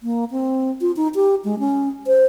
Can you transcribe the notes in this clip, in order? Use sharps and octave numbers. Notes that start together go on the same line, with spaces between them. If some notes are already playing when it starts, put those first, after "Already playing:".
A#3
C4
F4
D#4
G4
G#3
C#4
C5